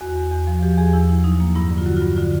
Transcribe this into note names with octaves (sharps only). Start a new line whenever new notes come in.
E2 F#4
E2
E2
F3
F3 G4
E2 G#4
E2 E4
F3 E4
F#3 D#4
A#3
G2 E4
D3
F4
F#3 F#4
F4
G2
D3 F4